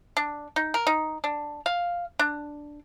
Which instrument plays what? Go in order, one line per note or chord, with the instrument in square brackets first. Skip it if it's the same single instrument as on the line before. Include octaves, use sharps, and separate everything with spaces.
[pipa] D4
D#4
A#4
D#4
D4
F5
D4